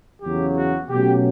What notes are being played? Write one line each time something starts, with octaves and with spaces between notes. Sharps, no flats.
E2 C#3 F#3 G4
F#4
B2 F#3 A3 C#4 G4